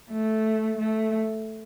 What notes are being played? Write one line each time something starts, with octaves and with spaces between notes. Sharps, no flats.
A3
A3